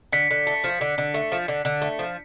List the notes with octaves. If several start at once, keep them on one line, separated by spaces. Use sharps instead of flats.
D3 B6 C#7
D3
A3
F3
D3
D3
A3
F3
D3
D3
A3
F3